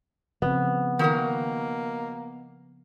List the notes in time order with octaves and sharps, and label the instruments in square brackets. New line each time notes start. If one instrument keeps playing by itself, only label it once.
[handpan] C#3 F3 C4 [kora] B3
[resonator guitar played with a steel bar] D#3 F#4 A#4 [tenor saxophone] A#3